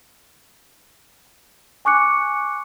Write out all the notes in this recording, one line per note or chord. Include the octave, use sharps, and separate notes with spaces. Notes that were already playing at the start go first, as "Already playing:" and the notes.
G#5 C#6 D6 F#6 C#7